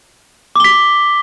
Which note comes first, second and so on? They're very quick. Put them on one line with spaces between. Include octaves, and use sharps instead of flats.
D6 G7 B6